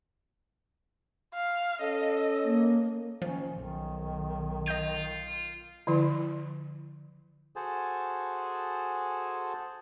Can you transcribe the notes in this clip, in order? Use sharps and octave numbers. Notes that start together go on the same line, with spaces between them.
F5
C#4 A4 D#5
A#3
D#3 F3 C#4
B1 D#3
F4 D#5 G6
D3 F3 E4
F#4 G#4 A4 C5 G#5 A5